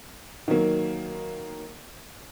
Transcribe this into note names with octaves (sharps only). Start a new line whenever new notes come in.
D#3 F#3 A#3